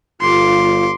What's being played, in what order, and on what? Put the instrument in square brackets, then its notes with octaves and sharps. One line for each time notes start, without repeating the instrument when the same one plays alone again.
[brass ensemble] G1 F4 [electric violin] C6 D6